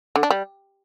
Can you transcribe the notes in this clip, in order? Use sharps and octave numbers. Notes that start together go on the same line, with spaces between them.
D3
D4
G3